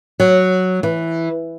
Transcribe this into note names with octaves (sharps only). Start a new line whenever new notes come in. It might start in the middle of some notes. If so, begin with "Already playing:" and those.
F#3
E3